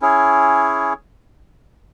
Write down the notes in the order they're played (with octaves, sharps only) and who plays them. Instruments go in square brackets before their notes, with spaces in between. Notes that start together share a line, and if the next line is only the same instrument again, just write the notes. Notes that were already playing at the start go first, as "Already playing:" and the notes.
[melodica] C#4 E4 G#4 C#5